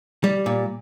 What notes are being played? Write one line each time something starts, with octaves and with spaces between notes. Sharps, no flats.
G3
A#2